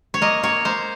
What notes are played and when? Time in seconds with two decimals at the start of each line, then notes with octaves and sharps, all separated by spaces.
0.14 C#5
0.22 A#3 D#5
0.43 A#3 C#5
0.65 A#3 C5